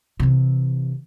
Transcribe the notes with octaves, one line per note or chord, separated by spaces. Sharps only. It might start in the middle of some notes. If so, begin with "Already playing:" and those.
C3 E3